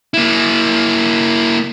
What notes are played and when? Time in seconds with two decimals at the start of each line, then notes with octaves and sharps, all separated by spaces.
0.14 A#3 E4